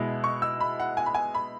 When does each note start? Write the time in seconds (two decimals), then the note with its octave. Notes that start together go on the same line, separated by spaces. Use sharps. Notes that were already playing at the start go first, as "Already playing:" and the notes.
Already playing: B2 G#3 E4
0.24 C#6
0.42 E6
0.60 B5
0.80 F#5
0.97 G#5
1.06 B5
1.14 G#5
1.34 B5